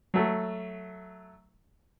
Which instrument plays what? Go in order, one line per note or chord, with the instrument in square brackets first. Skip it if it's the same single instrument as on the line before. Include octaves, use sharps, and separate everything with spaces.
[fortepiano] F#3 A3